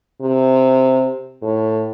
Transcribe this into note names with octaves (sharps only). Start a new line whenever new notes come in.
C3
A2